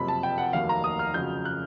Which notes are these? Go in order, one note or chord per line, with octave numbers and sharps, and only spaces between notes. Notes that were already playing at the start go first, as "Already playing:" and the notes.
Already playing: F#1 F2 C3 F3 B5
A5
G5
F#5
F1 D#2 D#3 F#3 F5
A#5
D#6
F6
F2 C#3 F#3 G6
F#6